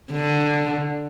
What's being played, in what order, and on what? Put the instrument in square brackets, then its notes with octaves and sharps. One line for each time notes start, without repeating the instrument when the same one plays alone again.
[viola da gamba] D3